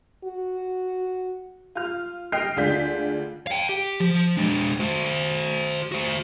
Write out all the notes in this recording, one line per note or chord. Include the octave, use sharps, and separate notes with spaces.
F#4
F4 F6
D#5 G5 F6 C7
D2 G#3 D4 F4 G6 B6
F5 G5
G4
F3
G#3 D4
F#4 C5
F#4 C5